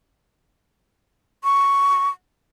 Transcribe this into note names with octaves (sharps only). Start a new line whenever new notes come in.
C#6